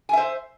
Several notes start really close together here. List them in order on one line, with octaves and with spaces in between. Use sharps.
G#5 E5 C5